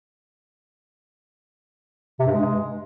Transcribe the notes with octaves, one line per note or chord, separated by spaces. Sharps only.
C3
G2
G#3